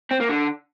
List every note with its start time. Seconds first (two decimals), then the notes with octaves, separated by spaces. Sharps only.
0.11 C4
0.20 A#3
0.29 D3